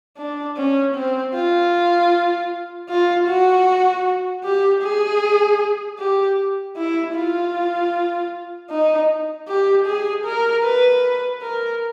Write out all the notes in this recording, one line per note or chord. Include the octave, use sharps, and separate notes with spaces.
D4
C#4
C4
F4
F4
F#4
G4
G#4
G4
E4
F4
D#4
G4
G#4
A#4
B4
A#4